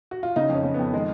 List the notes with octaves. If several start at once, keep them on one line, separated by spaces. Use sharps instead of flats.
F#4
F4
C#3 D#4
F2
C#4
C#3
B3
F2
D#3 G#3